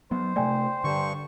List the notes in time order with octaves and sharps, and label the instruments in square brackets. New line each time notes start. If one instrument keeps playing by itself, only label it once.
[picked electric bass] F#3 B3 [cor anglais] C5
[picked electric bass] C3 A3 [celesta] D5 G5 G#5
[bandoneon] G2 C#6 [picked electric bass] D3